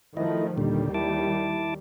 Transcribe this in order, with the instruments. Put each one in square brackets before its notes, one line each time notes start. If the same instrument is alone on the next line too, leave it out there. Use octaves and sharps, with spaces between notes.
[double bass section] D#3 F3 A3 [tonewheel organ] E4 D#5
[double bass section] D#2 D#3 G3 [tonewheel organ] A#2 D3
[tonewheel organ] E4 A5 D6